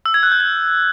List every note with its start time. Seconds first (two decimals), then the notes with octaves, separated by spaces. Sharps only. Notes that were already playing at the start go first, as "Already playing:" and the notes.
0.06 E6
0.14 G#6
0.23 F#6
0.32 G6
0.40 G#6